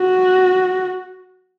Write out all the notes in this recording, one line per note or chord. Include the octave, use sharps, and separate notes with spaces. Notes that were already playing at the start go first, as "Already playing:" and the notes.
Already playing: F#4